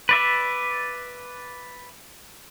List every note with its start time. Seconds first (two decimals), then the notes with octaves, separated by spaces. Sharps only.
0.09 B4 D5 E5